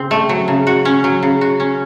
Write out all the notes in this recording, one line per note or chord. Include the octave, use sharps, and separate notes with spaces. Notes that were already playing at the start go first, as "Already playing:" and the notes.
Already playing: C#3 C4
A3
F#3
C#3
F#4
C#4
F#3
C#3
F#4
C#4